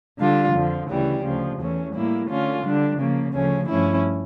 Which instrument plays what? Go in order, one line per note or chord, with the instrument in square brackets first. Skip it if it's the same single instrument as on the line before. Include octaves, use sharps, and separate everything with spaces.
[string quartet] D3 G3 D4 F4
F2 D3 F3
D2 C#3 E3 G3
D2 C#3 F3
E2 E3 A3 C#4
A2 G3 A#3 E4
D3 A3 C#4 F4
D3 G3 D4
C#3 F3 A#3
D2 C#3 F3 A3 C#4
G2 F3 A3 C#4 E4